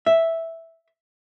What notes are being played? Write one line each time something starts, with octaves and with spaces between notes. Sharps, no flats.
E5